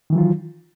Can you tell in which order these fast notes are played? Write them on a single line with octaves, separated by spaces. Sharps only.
D#3 E3 F#3 F4